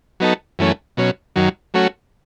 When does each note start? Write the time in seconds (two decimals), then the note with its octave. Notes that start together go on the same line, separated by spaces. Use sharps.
0.20 F#3 B3 D#4 A4
0.59 F#2 E3 A3 C#4
0.97 B2 F#3 C#4
1.36 F#2 D#3 F#3
1.74 F#3 A3 C#4 F#4